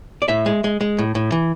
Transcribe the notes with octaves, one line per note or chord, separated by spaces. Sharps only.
D5
A2 E5
G#3
G#3
G#3
A2
A2
E3